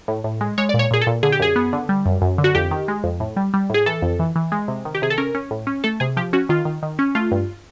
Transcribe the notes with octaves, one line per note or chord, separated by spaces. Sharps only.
A2
A2
G#3
G#3 C#5
A#2 D5
C#5
A#2 G#4
A4
A#2
D3 G#4
G4
F#2 G#4
B3
D3
G3
F#2
F#2
D3
F#4
F2 G4
D#3
G#3
F2
A2
G3
G3
A2 G#4
E3 A4
F2
E3
E3
G#3
C3
D#3
G4
C3 G#4
A4
C#4 A#4
C#4
A2
C#4
A3 A4
C3 G#4
F3 G4
C#4 F#4
D#3 F4
D#3
D#3
C#4
A3 F4
G2